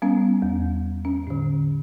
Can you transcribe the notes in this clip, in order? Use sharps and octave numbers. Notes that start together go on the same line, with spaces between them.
G3 B3 C#4
E2
C#4
A2 D3